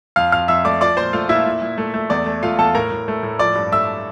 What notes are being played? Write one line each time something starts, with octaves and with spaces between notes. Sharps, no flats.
F2 F5 F6
F2 F5 F6
F2 E5 E6
A3 D5 D6
F3 D5 D6
A#2 C5 C6
A3 F4 F5
A#2 E4 E5
A#2
A#2
A3
A3
E2 D5
A3
A3 F4 F5
E2 A4 A5
A2 A#4 A#5
A2
A3
A2
F3 D5 D6
G2
A3 E5 E6